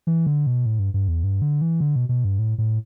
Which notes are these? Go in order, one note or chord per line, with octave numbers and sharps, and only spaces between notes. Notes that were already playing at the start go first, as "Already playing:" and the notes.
E3
D3
B2
A2
G2
G2
E2
G2
D3
E3
D3
B2
B2
G2
A2
A2